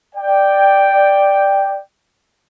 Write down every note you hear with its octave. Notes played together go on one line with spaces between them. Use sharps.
D5 G5